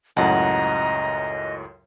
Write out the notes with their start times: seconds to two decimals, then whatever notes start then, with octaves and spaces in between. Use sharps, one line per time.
0.17 C#2 F#2 A2 D#5 F#5 A5 A#5